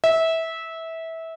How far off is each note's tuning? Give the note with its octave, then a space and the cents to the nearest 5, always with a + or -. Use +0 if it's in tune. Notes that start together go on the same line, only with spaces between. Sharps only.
E5 -20